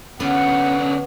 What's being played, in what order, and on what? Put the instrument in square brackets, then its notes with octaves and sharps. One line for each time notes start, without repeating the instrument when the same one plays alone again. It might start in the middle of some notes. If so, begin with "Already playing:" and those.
[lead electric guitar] D3 C#4 [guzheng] B3 [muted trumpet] F#5